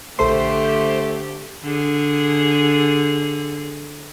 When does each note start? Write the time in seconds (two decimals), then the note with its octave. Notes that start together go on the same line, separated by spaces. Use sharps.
0.19 A#1 D3 A3 G4 A4 C5 C6
1.64 D3 G#4